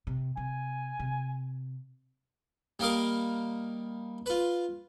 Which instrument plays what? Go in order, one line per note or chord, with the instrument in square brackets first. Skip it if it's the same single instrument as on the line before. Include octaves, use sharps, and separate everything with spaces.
[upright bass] C3
[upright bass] C3 [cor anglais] G#5
[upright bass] C3
[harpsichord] G3 A#3 A#4 D#5 F5
F4 B4